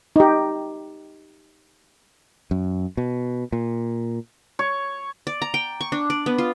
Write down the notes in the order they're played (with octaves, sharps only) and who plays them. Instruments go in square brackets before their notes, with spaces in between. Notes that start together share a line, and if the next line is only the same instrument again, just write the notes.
[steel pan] D#4 G4
[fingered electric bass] F#2
B2
A#2
[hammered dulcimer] C#5
[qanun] D5
A#5
G5
C#6
D4
D5
B3
F4